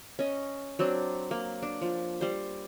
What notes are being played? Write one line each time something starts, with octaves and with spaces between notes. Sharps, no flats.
C#4 D#5
F#3 C4 D4
A#3
D4
F3
G3 C5